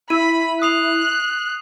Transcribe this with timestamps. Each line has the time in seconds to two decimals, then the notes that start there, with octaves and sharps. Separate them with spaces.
0.10 E4 B5 D#7
0.62 D#6 F#6 C7 F7